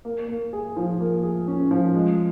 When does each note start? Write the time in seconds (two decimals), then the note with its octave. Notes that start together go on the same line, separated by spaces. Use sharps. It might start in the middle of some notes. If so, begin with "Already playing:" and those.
0.05 A#3
0.28 A#3
0.53 G#4
0.76 F3
1.00 A#3
1.23 G#4
1.48 C#4
1.71 F3
1.94 G#3